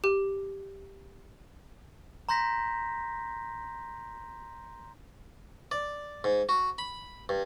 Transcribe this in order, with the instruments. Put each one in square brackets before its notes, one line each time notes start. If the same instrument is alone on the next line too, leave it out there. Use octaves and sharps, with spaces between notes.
[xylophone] G4
[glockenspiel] A#5 C6 G6 A#6 B6
[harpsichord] D5
G#2
F#4
B5
G2